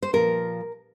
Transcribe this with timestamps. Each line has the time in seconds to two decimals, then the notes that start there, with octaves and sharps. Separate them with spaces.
0.02 C5
0.13 A#2 F3 A#4